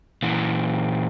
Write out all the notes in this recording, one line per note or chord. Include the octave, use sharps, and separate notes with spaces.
A#2 E3